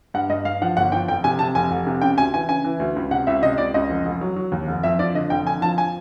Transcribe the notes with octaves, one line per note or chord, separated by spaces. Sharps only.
G2 F#5
G2 D#5
G2 F5
F3 F#5
G1 F#5
F3 G5
F1 G5
C3 G#5
C3 A5
F1 G#5
F1
C3
C#3 G5
D2 G#5
E3 G#5
C#3 G#5
E3
D2
C#2
C3 F#5
C#2 E5
C3 D#5
C#2 D5
C#2 D#5
F1
F1
F#3
F#3
D#2
F1
F2 E5
F3 D5
D3 D#5
F1 G5
D3 G#5
F3 A5
G#5